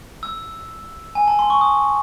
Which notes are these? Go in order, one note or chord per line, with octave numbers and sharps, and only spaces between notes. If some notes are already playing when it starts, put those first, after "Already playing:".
E6
G#5
A5
C6
C#6
D#6